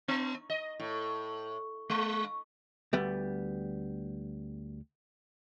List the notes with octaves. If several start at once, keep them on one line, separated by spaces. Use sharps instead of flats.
B3
D#5
A2
G#3
D2 G3 B3